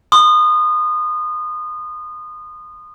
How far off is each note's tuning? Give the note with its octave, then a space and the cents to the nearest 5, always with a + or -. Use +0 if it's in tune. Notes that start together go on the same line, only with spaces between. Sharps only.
C6 +0 D#6 -25